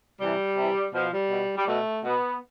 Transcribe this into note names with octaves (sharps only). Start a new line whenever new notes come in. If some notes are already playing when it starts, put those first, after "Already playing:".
C3 E3 G3
C3 E3
B2 F3
G3
B2
G3
B2 A3
B2 B3